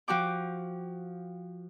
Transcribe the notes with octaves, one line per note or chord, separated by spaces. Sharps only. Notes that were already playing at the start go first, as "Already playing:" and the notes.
F3 F#4 G5 D6